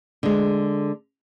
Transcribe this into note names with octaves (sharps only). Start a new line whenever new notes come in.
D3 G#3